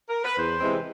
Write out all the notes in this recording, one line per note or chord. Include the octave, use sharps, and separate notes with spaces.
A#4
B4
E2 C5
C3 E3 G#3 C4